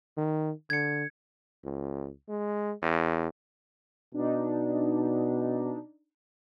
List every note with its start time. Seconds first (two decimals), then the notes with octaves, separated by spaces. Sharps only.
0.17 D#3
0.70 D3 G#6 C#7
1.65 C#2
2.29 G#3
2.82 E2
4.14 B2 D4 D#4